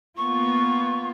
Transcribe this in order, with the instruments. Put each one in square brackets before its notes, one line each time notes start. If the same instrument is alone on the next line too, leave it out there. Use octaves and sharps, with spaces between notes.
[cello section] A#3 B3 F4 [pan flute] C#6